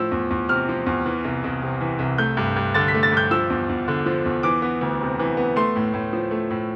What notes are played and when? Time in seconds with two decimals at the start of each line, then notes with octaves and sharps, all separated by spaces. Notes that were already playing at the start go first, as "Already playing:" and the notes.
Already playing: A2 F3 E6
0.12 E2
0.30 E2
0.49 C3 F6
0.69 F3
0.86 E2
1.06 E3
1.24 C2
1.44 C2
1.62 C3
1.81 E3
1.99 C2
2.18 A3 G6
2.37 G2
2.57 G2
2.74 D3 A6
2.88 B6
2.94 A3
3.03 A6
3.12 G2
3.17 G6
3.31 F3 E6
3.50 E2
3.69 E2
3.88 D3
4.06 F3
4.26 E2
4.43 E3 D6
4.62 B3
4.81 D2
5.01 C3
5.19 E3
5.37 B3
5.56 A3 C6
5.76 A2
5.94 A2
6.13 F3
6.31 A3
6.51 A2